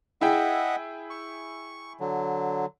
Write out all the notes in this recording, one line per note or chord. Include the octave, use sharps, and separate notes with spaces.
E4 G#4 D#5 E5 F#5 G5
C#6
D3 F#3